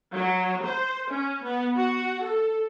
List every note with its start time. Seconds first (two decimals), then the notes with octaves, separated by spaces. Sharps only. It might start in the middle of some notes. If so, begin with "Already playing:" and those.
0.14 F#3
0.64 C5
1.09 C#4
1.42 B3
1.76 F#4
2.23 A4